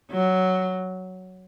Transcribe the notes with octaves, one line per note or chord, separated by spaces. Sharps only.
F#3